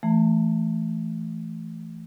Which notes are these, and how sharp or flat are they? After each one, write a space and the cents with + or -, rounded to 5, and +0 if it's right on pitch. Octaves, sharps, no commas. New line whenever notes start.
E3 +20 A3 +0 A#5 -45